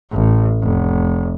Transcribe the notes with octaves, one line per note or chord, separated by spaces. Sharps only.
A1
F1